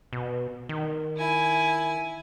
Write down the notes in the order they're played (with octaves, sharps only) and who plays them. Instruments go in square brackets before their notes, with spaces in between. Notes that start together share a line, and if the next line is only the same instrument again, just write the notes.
[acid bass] B2
D#3
[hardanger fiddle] E4 G#5